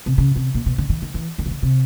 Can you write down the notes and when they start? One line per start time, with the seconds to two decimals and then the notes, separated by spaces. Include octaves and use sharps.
0.06 C3
0.18 C#3
0.36 C3
0.54 A#2
0.66 B2
0.78 D3
0.89 D#3
1.02 D#3
1.14 E3
1.38 D#3
1.46 C#3
1.51 D3
1.63 C3